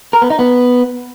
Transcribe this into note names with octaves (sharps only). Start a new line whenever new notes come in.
A#4
B3
D#4
B3